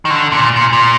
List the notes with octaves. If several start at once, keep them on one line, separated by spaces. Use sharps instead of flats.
D#3
D3
A#2
A#2
A#2